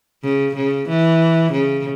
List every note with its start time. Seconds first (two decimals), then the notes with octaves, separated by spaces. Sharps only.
0.24 C#3
0.56 C#3
0.88 E3
1.53 C#3